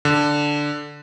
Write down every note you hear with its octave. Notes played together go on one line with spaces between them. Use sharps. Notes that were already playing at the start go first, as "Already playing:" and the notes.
D3